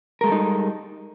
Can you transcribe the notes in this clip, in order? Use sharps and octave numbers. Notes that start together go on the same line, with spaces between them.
G3 G#3 D#4 A4 A#4